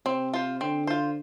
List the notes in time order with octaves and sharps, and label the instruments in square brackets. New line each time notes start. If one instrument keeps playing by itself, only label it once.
[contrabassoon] C3 [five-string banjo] C4
[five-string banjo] F4 C5
[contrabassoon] D3 [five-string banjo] C4
[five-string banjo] F4 C5